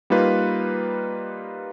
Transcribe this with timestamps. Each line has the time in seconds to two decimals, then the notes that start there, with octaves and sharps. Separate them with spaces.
0.10 G3 A#3 D#4 F4 B4